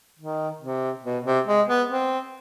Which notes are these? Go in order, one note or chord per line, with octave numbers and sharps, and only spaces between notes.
D#3
C3
B2
C3
G#3
B3
C4